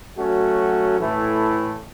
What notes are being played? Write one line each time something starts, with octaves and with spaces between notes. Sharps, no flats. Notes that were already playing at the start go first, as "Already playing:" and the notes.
F#3 A3 C#4 F#4
A2 E3 A3 E4